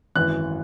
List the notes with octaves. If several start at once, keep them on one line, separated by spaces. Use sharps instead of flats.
G#1 F#2 E3 F#6